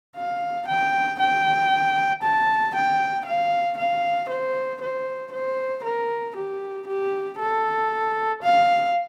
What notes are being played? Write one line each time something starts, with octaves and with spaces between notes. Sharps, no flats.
F5
G5
G5
A5
G5
F5
F5
C5
C5
C5
A#4
G4
G4
A4
F5